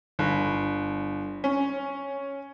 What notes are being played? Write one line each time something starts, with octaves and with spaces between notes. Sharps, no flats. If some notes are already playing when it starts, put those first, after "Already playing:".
G1
C#4